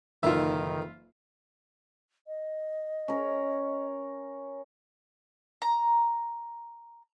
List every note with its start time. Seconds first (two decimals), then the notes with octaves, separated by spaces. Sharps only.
0.23 F#1 F2 A#2 D#3 E3 D#4 F4 E5
2.27 D#5
3.08 C#4 A#4
5.62 A#5